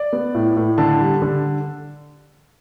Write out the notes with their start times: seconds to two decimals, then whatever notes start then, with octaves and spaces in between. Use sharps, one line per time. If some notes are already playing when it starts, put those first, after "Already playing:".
Already playing: D5
0.13 B3
0.35 A2
0.56 A2
0.78 D3 A5
1.00 G3
1.22 D3